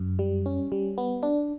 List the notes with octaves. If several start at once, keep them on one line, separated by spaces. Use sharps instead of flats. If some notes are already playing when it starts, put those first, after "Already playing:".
Already playing: F#2
G3
C#4
G3
B3
D4